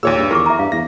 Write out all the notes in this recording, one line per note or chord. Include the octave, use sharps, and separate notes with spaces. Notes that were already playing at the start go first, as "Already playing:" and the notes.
D#2 A#2 G#4 C#5 E6
G2
E2 G4 A#4 C#6 D6
E5 A#5
G2 F5
E2 A#6